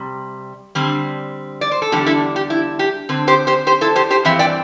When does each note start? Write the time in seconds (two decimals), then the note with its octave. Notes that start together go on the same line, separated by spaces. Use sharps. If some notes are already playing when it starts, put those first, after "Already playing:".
Already playing: C3 G3
0.75 D3 G3 C4
1.61 D5
1.71 C5
1.82 A4
1.92 E2 D3 G3 D4 G4
2.06 E4 A4
2.36 G4
2.50 E4
2.79 G4
3.09 D3 C4
3.27 G4 C5
3.47 G4 C5
3.67 G4 C5
3.81 E4 A4
3.95 G4 C5
4.10 G4 C5
4.25 G2 E3 C4 C5 E5
4.39 D5 G5